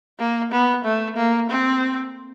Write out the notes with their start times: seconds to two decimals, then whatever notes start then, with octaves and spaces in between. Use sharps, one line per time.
0.19 A#3
0.51 B3
0.85 A3
1.16 A#3
1.50 C4